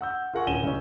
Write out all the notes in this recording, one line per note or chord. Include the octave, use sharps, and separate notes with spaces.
F#5 E6 G6
F4 G#4 A#4 F#5 G#5 C#6
D1 C#4 G#5 D#7 E7 G7
C#2 C#3 C#4